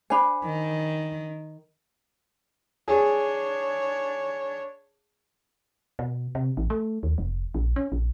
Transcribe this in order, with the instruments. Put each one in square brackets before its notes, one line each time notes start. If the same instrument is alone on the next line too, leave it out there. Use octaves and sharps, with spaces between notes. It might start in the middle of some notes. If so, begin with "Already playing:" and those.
[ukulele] D4 G#5 [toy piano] C5 D5 B5
[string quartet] D#3
[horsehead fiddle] D4 C#5 [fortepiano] G#4
[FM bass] B2
C3
A1
A3
D#2
F1
A#1
C#4
A#1